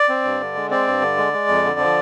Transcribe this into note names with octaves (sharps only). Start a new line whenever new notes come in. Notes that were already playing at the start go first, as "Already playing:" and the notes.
Already playing: D5
C4
G2
D3
G#3
C4 D5
G2
D3
G#3
G#3
F2
D3
F3